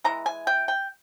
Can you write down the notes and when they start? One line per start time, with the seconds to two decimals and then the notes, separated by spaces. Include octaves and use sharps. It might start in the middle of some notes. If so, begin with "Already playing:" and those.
0.04 E3 G#3 A#5
0.26 G#5
0.47 G5
0.68 G5